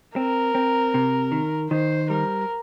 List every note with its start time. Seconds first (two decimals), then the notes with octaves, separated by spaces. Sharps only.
0.16 C4 A#4
0.55 C4
0.94 C3
1.32 D#3
1.70 D#3 C5
2.10 G3 A#4